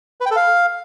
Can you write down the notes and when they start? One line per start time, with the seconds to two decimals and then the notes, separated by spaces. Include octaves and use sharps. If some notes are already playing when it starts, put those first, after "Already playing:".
0.21 B4
0.26 G5
0.31 A4
0.36 F5